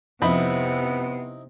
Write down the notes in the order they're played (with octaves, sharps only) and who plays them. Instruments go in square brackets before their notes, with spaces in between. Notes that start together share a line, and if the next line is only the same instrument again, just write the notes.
[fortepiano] F2 B5 [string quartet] C3 [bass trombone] B3 [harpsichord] C4 D#4 E4